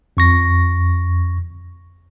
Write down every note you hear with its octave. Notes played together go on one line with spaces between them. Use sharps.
F2 C#6 A#6